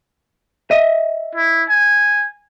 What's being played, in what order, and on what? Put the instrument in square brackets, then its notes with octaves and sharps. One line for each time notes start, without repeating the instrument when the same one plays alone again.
[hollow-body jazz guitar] D#5 E5
[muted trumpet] E4
G#5